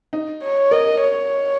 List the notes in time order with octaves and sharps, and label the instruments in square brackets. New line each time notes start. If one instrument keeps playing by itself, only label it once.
[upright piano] D#4
[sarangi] C#5
[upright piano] A#4 [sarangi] D#5
[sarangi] C#5